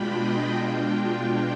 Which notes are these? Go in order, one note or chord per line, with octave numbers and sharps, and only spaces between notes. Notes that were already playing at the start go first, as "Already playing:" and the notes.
Already playing: B2 G#3 D4 F4 G5 B5
D#5
B2 G#3 D4 F4 G5